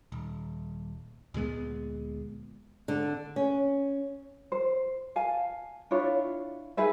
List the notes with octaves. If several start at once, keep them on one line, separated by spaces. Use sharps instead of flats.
D#1
D2 A#2 G#3 B3
D3
C#4
C5
F5 G#5 A5
D4 E4 F4 C#5
D#4 G#4 B4 E5